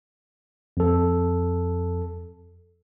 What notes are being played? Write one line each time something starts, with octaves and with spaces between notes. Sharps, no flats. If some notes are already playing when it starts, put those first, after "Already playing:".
F2 A4